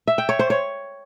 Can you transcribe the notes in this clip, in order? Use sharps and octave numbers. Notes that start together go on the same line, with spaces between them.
E5
G5
C#5
C5
C#5